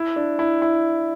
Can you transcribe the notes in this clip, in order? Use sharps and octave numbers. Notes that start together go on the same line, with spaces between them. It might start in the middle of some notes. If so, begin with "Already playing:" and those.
Already playing: E4
D4
E4
E4